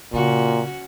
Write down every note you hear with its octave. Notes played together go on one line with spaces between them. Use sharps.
A#2 C#3 C#4 F#4